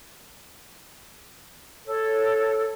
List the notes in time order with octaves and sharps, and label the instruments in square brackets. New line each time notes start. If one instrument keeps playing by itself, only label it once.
[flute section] A4 C#5